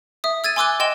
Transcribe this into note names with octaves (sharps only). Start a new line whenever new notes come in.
E5 D#6
E6 G#6 A6 D#7
G#5 C6 D6 E6 F#6 G7
D#5 G5 C6 E7 G7